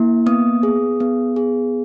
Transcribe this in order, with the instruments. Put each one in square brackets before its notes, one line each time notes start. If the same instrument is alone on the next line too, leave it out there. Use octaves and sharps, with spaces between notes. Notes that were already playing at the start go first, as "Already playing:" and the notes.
Already playing: [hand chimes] A#3 E4
B3 D#6
G#4
B3
G#4